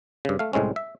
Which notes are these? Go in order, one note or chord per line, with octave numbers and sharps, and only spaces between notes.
G2 C#3
A3 F5
C2 A2 G#3 C4 C#4
E5